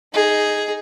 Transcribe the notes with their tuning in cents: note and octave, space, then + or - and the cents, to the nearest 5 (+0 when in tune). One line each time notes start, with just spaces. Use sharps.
D#4 +0 G#4 +0